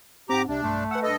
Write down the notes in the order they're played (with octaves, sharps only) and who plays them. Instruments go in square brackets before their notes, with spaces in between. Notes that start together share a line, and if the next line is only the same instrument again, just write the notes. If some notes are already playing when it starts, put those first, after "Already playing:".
[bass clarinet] G#2 [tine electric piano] C4 F#5 [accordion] G4 A#5 D6
[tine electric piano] C2 [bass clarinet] C3 [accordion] D4
[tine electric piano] B1 G2 C6 [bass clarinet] A3
[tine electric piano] B4 G#5 E6 [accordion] F#5
[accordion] G2 A4 D#5 [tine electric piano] B4